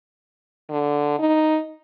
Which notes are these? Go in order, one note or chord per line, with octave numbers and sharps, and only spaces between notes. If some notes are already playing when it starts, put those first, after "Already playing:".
D3
D#4